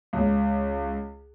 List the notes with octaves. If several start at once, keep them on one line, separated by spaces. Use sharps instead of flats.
C#2